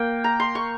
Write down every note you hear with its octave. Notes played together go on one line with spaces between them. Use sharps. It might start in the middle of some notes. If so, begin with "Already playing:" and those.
Already playing: A#3 G5
A#5
C6
C#6